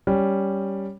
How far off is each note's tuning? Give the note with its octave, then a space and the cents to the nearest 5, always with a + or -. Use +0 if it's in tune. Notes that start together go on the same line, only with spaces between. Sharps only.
G3 +0 C#4 +5